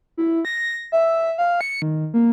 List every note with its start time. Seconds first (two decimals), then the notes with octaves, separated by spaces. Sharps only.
0.17 E4
0.45 A#6
0.92 E5
1.38 F5
1.61 C#7
1.82 D#3
2.14 A#3